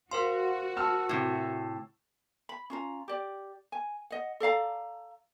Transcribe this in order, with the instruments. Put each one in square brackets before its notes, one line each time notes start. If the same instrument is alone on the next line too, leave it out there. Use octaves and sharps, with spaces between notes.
[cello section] F#4 [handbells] A#4 C5 C6 [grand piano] F5
[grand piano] A5 E6 F6
[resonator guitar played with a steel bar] A2 C3
[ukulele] B5
C#4 F4 A#5
G4 D5
G#5
D#5 F#5
A4 D5 F5 A#5